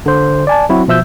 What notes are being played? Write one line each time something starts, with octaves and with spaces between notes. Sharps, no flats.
D3 C5
D5 G#5 A5
F#3 C4 E4 F#4
B2 F3 E5 E6 G6